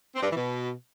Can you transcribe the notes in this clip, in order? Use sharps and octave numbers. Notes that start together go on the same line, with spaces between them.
C4
G2
E3
B2